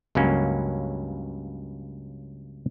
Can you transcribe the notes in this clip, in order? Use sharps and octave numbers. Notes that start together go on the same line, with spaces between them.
C#2 G2 F#3 A#3 C#4